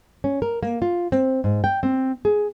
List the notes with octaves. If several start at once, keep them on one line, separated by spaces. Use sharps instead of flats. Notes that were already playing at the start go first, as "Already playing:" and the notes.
C#4
A#4
A#3
F4
C4
G#2
G5
C4
G#4